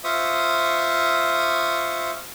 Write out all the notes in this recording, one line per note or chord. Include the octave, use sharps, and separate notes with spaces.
F4 C5 E5 C#6 D#6